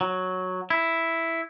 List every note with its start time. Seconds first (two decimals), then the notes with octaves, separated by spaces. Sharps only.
0.01 F#3
0.70 E4